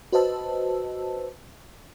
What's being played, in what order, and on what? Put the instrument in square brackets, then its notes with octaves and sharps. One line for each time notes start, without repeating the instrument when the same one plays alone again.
[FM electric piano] F#4 B4 C5 D#5 A5 E6